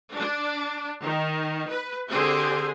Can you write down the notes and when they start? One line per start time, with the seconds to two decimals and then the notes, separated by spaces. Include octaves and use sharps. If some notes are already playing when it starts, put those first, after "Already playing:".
0.14 D4
1.01 D#3
1.68 B4
2.10 D3 C4 G4 G#4 C5